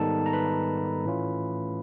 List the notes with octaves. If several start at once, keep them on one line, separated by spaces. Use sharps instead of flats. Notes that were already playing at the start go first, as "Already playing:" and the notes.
Already playing: G#2 D#3 G3 B3 D#4 A4 A5
A#5
B4 B5
A2 E3 A3 C#4 F4